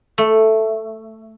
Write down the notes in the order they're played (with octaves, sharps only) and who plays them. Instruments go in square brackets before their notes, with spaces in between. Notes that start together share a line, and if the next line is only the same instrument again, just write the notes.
[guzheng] A3